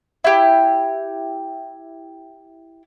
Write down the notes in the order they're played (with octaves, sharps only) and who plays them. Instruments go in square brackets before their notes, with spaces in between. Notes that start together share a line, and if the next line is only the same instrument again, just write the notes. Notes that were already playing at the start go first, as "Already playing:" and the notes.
[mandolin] E4 G4